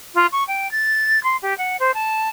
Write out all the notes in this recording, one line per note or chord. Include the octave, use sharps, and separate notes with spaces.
F4
C#6
G5
A6
C6
G4
F#5
C5
A5